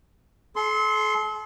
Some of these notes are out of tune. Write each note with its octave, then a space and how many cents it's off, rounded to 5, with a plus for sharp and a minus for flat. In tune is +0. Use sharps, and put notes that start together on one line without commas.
A4 -40 C6 +0